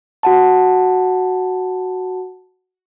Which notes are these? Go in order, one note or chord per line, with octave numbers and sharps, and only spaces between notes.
F#4 F#5 A5